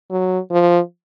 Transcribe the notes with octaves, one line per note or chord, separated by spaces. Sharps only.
F#3
F3